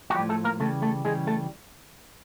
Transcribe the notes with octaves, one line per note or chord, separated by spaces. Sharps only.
F#4
A2 F3 G3 G4
A3 A4
A#3 A#4
C#3 E3 G3 A3 A4
A3 A4
C#3 E3 G3 G#3 G#4
A3 A4